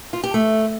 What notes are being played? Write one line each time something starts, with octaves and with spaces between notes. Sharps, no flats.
F4
G4
A3